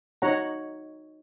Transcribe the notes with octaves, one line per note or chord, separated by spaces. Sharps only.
D#4 F#4 C#5 F#5 A#5